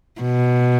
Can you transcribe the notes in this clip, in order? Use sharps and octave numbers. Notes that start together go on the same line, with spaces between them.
B2